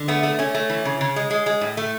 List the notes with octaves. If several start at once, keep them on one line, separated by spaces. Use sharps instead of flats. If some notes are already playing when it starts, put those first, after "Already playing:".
Already playing: D3
A3 B3
A3
A3 C#4
A3
E3
C#3
C#3
G#3
G#3
G#3
A2
A3